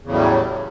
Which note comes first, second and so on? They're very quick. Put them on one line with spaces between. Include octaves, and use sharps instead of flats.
E2 C#3 A2 F#3 G3